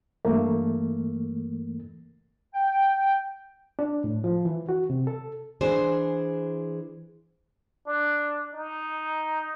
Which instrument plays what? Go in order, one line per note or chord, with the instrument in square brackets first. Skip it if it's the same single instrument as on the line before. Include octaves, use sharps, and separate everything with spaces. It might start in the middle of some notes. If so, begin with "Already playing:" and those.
[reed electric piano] G2 E3 A3 A#3
[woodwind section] G5
[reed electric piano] D4
A2
F3
E3
F#4
C3
A4
[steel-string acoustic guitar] E3 D4 G#4 C5
[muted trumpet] D4
D#4